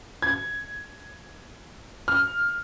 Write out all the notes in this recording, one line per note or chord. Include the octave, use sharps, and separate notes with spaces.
G#6
F6